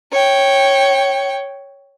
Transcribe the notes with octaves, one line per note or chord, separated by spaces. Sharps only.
C#5 G5